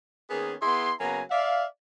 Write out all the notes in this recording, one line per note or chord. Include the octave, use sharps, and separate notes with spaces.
D#3 A#3 B3 C#4 G#4
B3 E4 G#4 C6
C#3 F#3 A#3 B3 G#5 A#5
D5 E5 F5